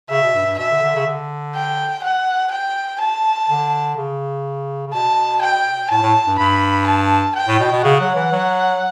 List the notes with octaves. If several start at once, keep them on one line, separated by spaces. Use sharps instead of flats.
C#3 E5
B2
G2
G2
B2 E5
D3
D3
C#3
D3
G5
F#5
G5
A5
D3
C#3
C#3
B2 A5
G5
A2 A5
A2
G2
G2 B5
A5
G5
A2
B2
B2
C#3 F#5
F#3
E3
F#3